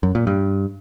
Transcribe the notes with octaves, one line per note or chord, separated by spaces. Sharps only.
F#2
A#2
G2